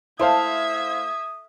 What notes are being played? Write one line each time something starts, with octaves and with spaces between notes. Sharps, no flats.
A3 E4 C5 E5 F5 D#6 G#6